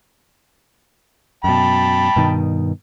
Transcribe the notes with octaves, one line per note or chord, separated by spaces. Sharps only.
F#2 B2 G5 A5 B5
G2 B2 D#3